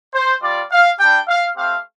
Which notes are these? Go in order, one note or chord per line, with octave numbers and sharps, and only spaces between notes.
C5
G3 F4 D5
F5
G3 D4 G4 G5
F5
A3 C4 G4 F5